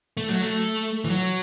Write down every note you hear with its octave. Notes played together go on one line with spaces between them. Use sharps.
A3
F#3
A3
E3
F#3